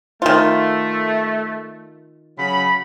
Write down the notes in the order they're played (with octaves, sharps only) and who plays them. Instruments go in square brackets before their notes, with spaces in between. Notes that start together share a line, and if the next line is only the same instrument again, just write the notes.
[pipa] D#3 F4 [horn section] A3
[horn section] C#3 F#3 B5